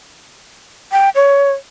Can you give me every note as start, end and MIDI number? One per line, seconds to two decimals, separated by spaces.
0.92 1.09 79
1.15 1.51 73